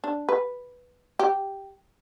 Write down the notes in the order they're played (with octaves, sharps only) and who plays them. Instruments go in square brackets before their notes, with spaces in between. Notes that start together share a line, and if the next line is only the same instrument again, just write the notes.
[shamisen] D4
B4
G4